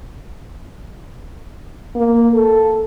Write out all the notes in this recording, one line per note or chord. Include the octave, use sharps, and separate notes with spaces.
A#3
A4